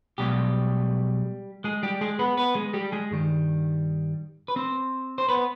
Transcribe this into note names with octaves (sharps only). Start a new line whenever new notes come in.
B1 B2 G3 G#3 G4
G#3 G#4
G3 G4
G#3 G#4
B3 B4
B3 B4
G#3 G#4
G3 G4
G#3 G#4
G2 D#3 G3
B4
C4 C5
C5
B3 B4